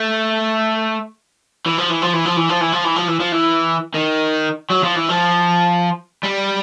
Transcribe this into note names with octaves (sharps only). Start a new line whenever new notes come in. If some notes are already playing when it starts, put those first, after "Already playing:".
Already playing: A3
E3
F3
E3
F3
E3
F3
E3
F3
E3
F3
E3
F3
E3
F3
E3
D#3
F#3
F3
E3
F3
G3